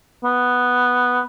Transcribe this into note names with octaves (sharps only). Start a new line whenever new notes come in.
B3